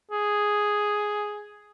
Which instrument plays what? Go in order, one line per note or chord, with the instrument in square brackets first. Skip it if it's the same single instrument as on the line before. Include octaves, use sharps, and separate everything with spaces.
[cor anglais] G#4